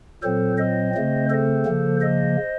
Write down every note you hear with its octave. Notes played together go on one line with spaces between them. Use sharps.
A#2 F#3 C4 A4 C5
C5 D#5
C#3 A3 C4
A4 C5
C#3 F3 A#3
C5 D#5